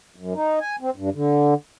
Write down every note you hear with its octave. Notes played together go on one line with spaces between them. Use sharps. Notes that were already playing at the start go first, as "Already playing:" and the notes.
F#2
D#4
G#5
C4
G2
D3